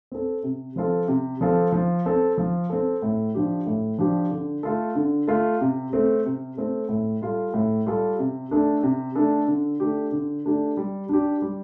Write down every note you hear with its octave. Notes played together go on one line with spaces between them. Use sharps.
C4 A4
C3
F3 C4 F4 A4
C3
F3 C4 F4 A4
F3
C4 A4
F3
C4 A4
A2
F3 D4 G4
A2
F3 D4 G4
D3
A3 F4 A4
D3
A3 F4 A4
C3
A3 C4 A4
C3
A3 C4 A4
A2
G3 F4 A4
A2
G3 F4 A4
C3
A3 D4 A4
C3
A3 D4 A4
D3
A3 D4 G4
D3
A3 D4 G4
G3
D4 G4
G3